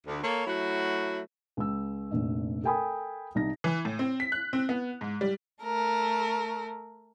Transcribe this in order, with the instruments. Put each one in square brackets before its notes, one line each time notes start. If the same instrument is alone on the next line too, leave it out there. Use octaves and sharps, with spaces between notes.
[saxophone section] D2
A#3 A4 C#5
F#3 A3 E4 F#4
[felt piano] C#2 E6
F1 A#1
A4 A#4 G5 G#5 B5 D#6
C2 D#4 A#6
[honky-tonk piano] E3
A2
C4
B6
F#6
C4
B3
G#2
G3
[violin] A3 A#4